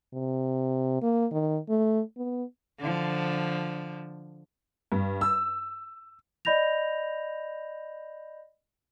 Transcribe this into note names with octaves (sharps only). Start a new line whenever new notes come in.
C3
A#3
D#3
A3
B3
D3 F3
G2
E6
D5 D#5 B5 G6 A#6 F7